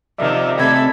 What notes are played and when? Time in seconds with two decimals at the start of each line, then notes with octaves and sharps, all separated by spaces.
0.18 C3 D#3 F3 D5 E5
0.59 C3 A3 A4 B5 G#6